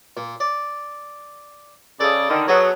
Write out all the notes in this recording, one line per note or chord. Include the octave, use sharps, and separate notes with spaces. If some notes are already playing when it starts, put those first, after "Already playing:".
A#2
D5
C#3 A4 D5 D#5
D3 D#3
F#3 B3 C#4 G#4 A4